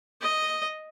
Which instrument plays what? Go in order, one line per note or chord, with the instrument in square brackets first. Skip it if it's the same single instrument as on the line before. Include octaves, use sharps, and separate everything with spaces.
[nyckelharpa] D#5